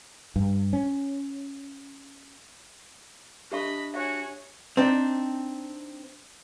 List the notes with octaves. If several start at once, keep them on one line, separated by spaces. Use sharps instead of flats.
G2
C#4
D4 G4 D#5 E5 B5 C#6
F#4 C#5 E5 G#5
C4 D4 D#4